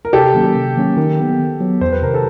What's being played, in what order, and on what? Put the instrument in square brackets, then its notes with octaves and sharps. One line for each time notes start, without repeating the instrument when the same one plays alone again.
[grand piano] A#4
[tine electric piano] C3 [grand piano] G4 A4
[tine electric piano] D#3 F#3 A#3 C#4
C3
D#3 F#3 A#3 C#4
D#3
F#3 B3
D#3
F#3 B3
[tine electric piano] E2 [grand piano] C5
[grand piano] B4
[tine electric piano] C3 D#3 [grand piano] A#4
[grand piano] A4 B4